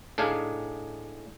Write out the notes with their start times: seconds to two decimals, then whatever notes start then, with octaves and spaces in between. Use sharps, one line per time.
0.18 A2 D4 D#4 G#4 F5 G#5